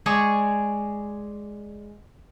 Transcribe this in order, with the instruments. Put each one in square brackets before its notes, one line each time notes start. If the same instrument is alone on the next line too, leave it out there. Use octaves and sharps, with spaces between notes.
[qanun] G#3 G#4 D5 C#6